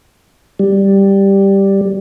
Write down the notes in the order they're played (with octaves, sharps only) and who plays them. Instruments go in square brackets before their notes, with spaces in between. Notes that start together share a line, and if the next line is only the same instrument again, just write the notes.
[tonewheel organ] G3